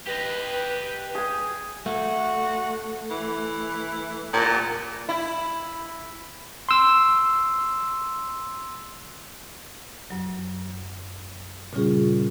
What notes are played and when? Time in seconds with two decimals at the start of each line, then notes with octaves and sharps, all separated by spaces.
0.07 G4 B4 D#5
1.15 G#4 G#5
1.86 A3 F#4
3.10 E3
4.33 A#2
5.09 E4
6.69 C6 E6
10.10 F#2 F#3
11.73 A#2 C#3 G3 C#4 F4 G#4